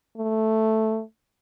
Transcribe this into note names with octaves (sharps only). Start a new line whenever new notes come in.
A3